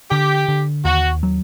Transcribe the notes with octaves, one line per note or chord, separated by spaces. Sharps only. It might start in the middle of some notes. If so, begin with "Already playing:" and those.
D3 G4
D3
D#2 F#4
F#3